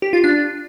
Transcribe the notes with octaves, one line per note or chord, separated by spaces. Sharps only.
G4
F4
D4